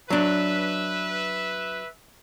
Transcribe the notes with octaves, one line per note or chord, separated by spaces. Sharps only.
F#3 D4 B4 E5